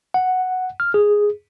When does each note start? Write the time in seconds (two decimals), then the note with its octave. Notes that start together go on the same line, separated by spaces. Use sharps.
0.14 F#5
0.80 F6
0.94 G#4